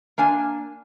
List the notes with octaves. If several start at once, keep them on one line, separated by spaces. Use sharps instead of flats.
A#3 D4 G#5